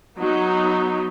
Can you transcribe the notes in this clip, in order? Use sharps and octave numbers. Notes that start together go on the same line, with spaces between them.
F#3 B3 D#4